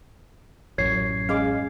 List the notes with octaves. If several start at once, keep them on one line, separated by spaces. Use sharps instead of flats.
A1 F#2 C#5 G#6 C7
G#3 C#4 F5 D6